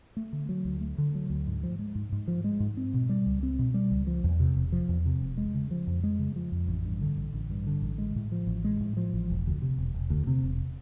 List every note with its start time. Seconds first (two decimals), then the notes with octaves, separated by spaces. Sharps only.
0.17 A3
0.33 D3
0.49 F#3
0.65 D2
0.81 A3
0.98 D3
1.15 F#3
1.30 D2
1.47 G#2
1.63 F3
1.79 G#3
1.95 G#2
2.12 G#2
2.28 F3
2.44 G#3
2.60 G#2
2.77 C4
2.94 B2
3.09 G3
3.26 C#2
3.43 C4
3.59 B2
3.74 G3
3.91 C#2
4.07 F3
4.24 E2
4.40 C3
4.57 E1
4.72 F3
4.89 E2
5.06 C3
5.22 E1
5.37 G#3
5.54 C#3
5.71 F3
5.87 F2
6.04 G#3
6.19 C#3
6.36 F3
6.52 F2
6.68 A1
6.85 G2
7.01 D3
7.17 A1
7.34 A1
7.50 G2
7.67 D3
7.82 A1
7.98 G#3
8.16 A2
8.32 F3
8.47 A1
8.64 G#3
8.81 A2
8.97 F3
9.14 A1
9.30 E1
9.46 D2
9.62 C3
9.78 E1
9.94 E1
10.10 D2
10.27 C3
10.43 E1